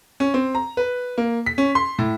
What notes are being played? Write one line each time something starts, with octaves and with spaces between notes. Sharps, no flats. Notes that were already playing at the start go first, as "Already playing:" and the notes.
C#4
C4
A#5
B4
A#3
B6
C#4
C6
A2